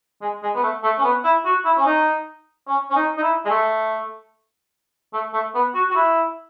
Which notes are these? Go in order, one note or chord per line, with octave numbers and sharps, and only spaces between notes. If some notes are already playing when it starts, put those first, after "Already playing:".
G#3
G#3
B3
A3
A3
C#4
B3
E4
F#4
E4
C#4
D#4
C#4
C#4
D#4
D#4
E4
G#3
A3
A3
A3
B3
F#4
F#4
E4